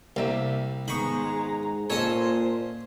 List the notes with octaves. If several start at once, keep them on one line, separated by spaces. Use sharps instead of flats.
C2 G3 A#3 E5
G#2 D#3 G#3 B3 A#5 B5 C#6
A#2 C#4 A4 C5 C#5 D#5